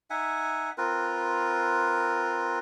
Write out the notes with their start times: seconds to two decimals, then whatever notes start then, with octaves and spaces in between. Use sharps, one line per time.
0.10 D#4 E5 F#5 G#5
0.78 C4 F4 A#4 B4